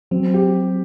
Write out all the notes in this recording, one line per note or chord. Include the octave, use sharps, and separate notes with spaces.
F#3 C4
G4